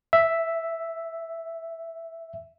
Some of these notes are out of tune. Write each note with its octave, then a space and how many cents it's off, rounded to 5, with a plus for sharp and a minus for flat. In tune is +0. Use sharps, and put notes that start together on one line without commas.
E5 +0